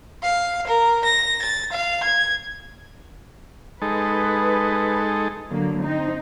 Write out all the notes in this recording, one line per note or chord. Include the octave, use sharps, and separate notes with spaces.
F5
A#4
A#6
A6
F5
G#6
G#3 D#4 A4 B4
D3 F#3 A#3
C4 D#4